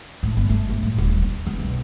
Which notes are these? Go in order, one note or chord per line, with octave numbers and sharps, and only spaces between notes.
A2
G1
A3
G1
A2
D#1
D#2
E2
B1